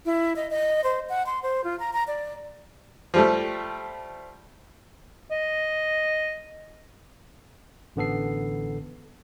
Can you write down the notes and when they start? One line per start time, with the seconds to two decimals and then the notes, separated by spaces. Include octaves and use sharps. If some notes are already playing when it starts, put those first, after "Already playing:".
0.06 E4
0.36 D#5
0.51 D#5
0.84 C5
1.09 F#5
1.26 C6
1.43 C5
1.64 F4
1.79 A#5
1.93 A#5
2.08 D5
3.14 F3 G3 A3
5.32 D#5
7.96 A1 D3 B3 A4 C7